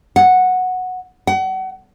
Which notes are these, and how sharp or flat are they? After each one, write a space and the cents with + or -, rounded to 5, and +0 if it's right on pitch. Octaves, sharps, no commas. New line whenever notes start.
F#5 -5
F#5 +35